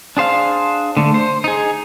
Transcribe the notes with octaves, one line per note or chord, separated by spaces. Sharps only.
D4 G#4 C5 F5 F6
D3 A3
C5
D#4 G#4